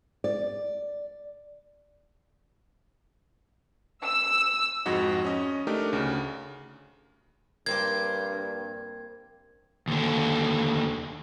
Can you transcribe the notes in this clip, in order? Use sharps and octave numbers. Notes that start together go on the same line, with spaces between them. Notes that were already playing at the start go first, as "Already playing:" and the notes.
D5
E6
F2 G#2 F#4 D#5
C#4 D#5
A3 D4 D#4 G4 A#4
D2 C#3
A#1 G2 A#3 C4 G4 G#6
D#2 D3